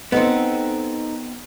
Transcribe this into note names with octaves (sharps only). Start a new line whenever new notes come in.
B3 C4 D#4 A4 F#5